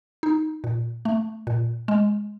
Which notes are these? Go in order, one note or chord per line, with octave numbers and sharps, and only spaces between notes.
D#4
A#2
A3
A#2
G#3